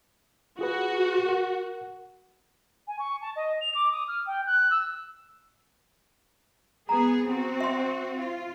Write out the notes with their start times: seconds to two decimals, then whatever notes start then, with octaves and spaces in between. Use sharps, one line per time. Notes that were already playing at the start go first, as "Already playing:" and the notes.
0.59 F4 F#4 G#4 B4
1.26 A#4 F#5
2.87 G#5
2.99 C#6
3.21 A5
3.36 D#5
3.61 F7
3.75 D6
3.92 D#6
4.08 F6
4.26 G5
4.46 F#6
4.71 E6
6.89 B3 G#4 A#5
7.26 C4 F#4
7.60 E5 C6
8.17 F4